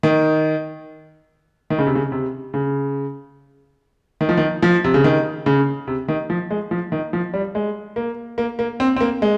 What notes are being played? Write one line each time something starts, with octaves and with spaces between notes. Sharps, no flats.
D#3
D#3
C#3
C3
C#3
C3
C#3
D#3
F3
D#3
F3
C3
C#3
D#3
C#3
C3
D#3
F3
G#3
F3
D#3
F3
G3
G#3
A#3
A#3
A#3
C4
C4
A#3
G#3